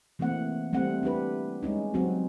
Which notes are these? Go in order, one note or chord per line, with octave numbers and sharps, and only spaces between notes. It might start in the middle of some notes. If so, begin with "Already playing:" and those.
E3 A3 A#3 C4 F#5
G3 A3 C4 F#5
D4 E4 G4 B4
G3 G#3 C#4 D#4
F#3 C4 C#4 F#4